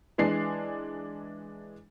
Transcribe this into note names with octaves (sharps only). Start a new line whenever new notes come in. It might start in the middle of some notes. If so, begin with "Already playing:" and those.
E3 G#3 D4 C7